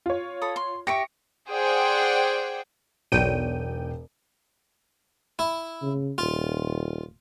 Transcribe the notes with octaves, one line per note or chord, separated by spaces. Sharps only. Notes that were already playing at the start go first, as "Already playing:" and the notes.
F4 C#5
A4 B5 D#6
C6
G4 E5 C#6 A#6 C#7 D7
G#4 C5 D5 F#5 G5
E1 B1 C#5 D5 G5 D#7
E4
C#3
D#1 F4